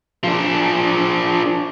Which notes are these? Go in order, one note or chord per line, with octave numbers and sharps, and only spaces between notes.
F3 D4